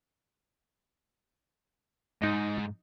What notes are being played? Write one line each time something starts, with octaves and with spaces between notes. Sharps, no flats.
G#2 D#4 D#5